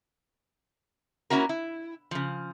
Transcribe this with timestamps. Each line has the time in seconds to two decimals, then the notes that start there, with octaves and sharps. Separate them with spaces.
1.30 A#3 C#4 E4 F#4 A#4
1.49 E4
2.11 C#3 F3